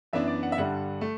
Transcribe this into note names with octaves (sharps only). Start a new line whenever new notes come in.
F#2 E3 B3 D4 E5
D5
F#5
E5
G2 D3 G3 F#5
A3